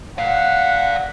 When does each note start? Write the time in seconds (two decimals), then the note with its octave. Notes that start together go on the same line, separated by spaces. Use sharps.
0.18 D5 F5 F#5